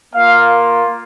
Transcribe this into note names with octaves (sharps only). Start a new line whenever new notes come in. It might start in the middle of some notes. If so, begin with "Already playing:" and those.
A#3 F4 F5